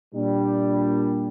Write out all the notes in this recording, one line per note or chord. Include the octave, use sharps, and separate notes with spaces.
A#2 G3 D4